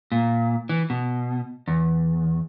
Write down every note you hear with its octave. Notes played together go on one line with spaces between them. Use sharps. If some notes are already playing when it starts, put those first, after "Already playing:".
A#2
E3
B2
E2